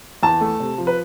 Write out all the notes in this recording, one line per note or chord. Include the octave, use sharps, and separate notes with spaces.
E2 A5
A3
C3
F3
B4